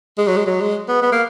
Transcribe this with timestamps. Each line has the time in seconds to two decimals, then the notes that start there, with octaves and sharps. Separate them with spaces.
0.18 G#3
0.27 F#3
0.37 G#3
0.46 F#3
0.60 G#3
0.88 B3
1.02 B3
1.12 A#3